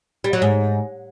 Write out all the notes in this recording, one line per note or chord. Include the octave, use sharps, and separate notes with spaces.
G3
F#3
G#2